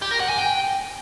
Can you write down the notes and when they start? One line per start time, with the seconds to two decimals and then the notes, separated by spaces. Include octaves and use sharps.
0.02 G4
0.11 A#4
0.20 F#5
0.29 G#5
0.38 G5